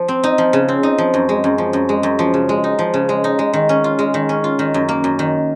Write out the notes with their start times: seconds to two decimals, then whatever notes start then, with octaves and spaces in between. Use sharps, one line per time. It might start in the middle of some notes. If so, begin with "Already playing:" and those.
Already playing: F3
0.08 C4
0.23 D#4
0.38 F3
0.53 C#3
0.68 C4
0.83 D#4
0.98 F3
1.14 F#2
1.29 G#3
1.44 F#2
1.58 F3
1.73 F#2
1.89 G#3
2.03 F#2
2.19 F3
2.34 C#3
2.49 G#3
2.64 D#4
2.79 F3
2.94 C#3
3.09 G#3
3.24 D#4
3.39 G#3
3.53 D#3
3.69 C#4
3.84 F4
3.99 G#3
4.14 D#3
4.29 C#4
4.44 F4
4.59 D#3
4.74 F#2
4.89 A#3
5.04 F#2
5.19 D#3